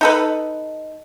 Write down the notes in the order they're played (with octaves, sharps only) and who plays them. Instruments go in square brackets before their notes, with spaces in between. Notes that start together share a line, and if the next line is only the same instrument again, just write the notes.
[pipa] D#4 A4 B4